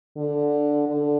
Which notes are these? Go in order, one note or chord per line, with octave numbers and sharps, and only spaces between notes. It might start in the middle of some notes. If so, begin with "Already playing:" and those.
D3
D3